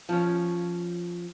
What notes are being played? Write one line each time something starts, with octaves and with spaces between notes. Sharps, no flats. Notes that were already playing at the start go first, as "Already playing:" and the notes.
F3 C#4